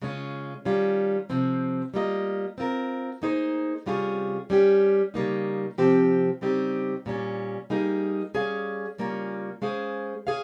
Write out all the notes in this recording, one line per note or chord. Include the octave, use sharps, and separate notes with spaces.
C#3 G#3 C#4 F4
D#3 G3 C#4 F4
C3 F3 C4
G3 A#3 F4 A#4 D#5
C4 F4 A#4
A#3 D#4 G#4 C5
C3 G3 C#4 F4 G#4
G3 C#4 G4
C#3 G3 A#3 D#4
C3 F3 C4 G4
C#3 G3 C4 D#4 G4
A#2 G3 C#4
G3 A#3 D#4 G#4
G3 C#4 G#4 C#5 F5
C#3 G3 A#3 C#4 F4
G#3 C#4 G#4 C5 F5
G#4 C#5 F5